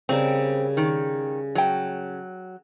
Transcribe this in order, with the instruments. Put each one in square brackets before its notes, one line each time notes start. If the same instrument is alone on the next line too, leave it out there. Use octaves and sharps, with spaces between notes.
[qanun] C#3 G3 A#4 [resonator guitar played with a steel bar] C4
[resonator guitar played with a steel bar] D#3
F#3 G5